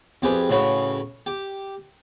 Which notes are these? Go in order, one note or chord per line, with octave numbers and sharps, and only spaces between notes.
F2 G4 G#4 B4
A2 C#3 F#4 B4
G4